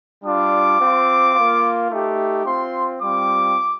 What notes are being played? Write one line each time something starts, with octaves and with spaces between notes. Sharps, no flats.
G3 D4 F4 D6
C4 F4
A#3 F4
A3 D#4 G4
C4 F4 C6
G3 C4 F4 D6